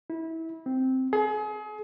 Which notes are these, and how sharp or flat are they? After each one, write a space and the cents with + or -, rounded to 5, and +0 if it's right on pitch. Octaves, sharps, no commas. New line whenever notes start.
E4 -25
C4 -5
G#4 +35